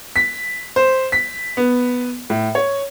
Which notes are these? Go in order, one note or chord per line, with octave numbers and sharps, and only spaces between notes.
B6
C5
B6
B3
A2
C#5